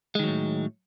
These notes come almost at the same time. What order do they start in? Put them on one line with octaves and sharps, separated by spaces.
G#3 D#3 F#3 A2